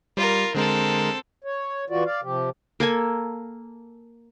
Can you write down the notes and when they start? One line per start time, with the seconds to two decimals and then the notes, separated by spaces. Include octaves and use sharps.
0.17 G3 F4 A#4
0.55 D3 G#3 C4 A4 A#4
1.44 C#5
1.90 E3 F4 F#4 D5
2.05 D5 F5
2.23 C3 F3 G4
2.80 A#3 A4 G#5